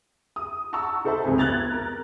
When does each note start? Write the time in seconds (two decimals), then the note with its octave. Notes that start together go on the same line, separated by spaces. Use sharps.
0.36 D#6
0.73 F#5 A5 A#5 C#6 E6
1.04 D#4 A4 C5 E5 A5 B5
1.24 F1 C#2 C3 G#5
1.38 B3 F#6 G#6 A6 F7
1.71 A#4 A#5